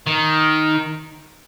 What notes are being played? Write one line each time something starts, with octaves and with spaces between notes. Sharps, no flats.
D#3